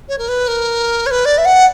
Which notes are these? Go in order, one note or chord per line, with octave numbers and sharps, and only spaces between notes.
C#5
A#4
B4
A#4
C#5
B4
D5
E5
F#5